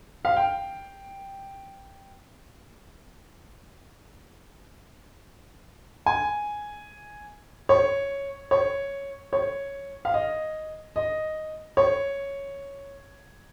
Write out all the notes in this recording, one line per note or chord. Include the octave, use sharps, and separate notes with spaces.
F5
G5
G#5
C#5
C#5
C#5
F5
D#5
D#5
C#5